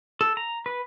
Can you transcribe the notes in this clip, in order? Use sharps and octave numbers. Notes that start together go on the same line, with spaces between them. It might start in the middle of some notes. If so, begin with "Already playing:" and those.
A4
A#5
B4